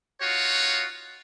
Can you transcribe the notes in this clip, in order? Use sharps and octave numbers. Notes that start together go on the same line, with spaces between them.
D#4 F4 F#4 C#5